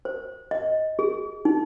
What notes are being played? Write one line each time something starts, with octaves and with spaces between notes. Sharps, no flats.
C5
D#5
G#4
D#4